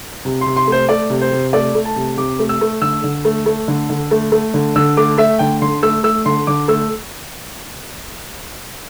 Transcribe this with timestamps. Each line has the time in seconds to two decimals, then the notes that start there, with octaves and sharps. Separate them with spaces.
0.25 C3
0.41 C3 C6
0.57 C6
0.67 A3 C5
0.89 A3 D5
1.10 C3
1.21 C5
1.32 C3
1.53 A3 D5
1.75 A3
1.85 A5
1.96 C3
2.17 C3 D6
2.39 A3
2.49 E6
2.61 A3
2.82 D3 E6
3.04 D3
3.25 A3
3.46 A3
3.68 D3
3.90 D3
4.11 A3
4.32 A3
4.54 D3
4.76 D3 E6
4.97 A3 D6
5.18 A3 E5
5.39 D3 G5
5.62 D3 C6
5.83 A3 E6
6.03 A3 E6
6.26 D3 C6
6.47 D3 D6
6.68 A3 E6